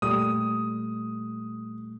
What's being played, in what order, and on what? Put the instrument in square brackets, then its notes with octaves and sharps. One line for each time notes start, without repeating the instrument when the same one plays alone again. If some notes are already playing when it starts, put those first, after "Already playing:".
[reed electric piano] A#2 G3 A3 [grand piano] D#6